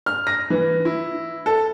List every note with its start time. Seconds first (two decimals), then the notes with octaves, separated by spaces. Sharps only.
0.06 F6
0.27 A#6
0.50 E3
0.85 E4
1.46 A4